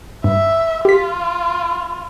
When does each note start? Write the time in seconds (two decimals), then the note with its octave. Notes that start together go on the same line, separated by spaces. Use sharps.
0.24 G2 E5
0.85 F4 G4 B6